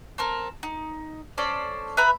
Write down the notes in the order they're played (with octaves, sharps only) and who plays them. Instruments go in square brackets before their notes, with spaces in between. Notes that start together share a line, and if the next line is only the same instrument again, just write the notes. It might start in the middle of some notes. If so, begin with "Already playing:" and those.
[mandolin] C4 A4 A#4
D#4
C#4 A4 C5 D5
B4 E5 A#5 B5